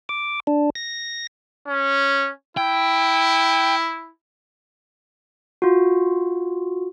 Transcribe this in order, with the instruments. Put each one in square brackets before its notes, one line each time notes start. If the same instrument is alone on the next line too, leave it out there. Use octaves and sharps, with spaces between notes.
[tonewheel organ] D6
D4
A#6
[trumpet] C#4
[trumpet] E4 [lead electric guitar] G5
[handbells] F4 F#4